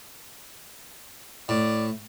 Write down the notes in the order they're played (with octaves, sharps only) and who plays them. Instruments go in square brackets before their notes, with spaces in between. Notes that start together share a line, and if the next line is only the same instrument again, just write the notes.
[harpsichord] A2 [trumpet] D5